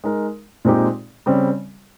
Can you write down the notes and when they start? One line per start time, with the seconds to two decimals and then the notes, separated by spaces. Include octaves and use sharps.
0.04 G#3 D#4 A#4
0.65 A#2 G#3 C4 D#4 G4
1.26 C#3 G3 C4